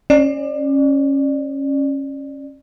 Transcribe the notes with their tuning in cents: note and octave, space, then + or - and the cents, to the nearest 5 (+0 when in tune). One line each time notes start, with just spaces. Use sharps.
C#4 -15 D5 +25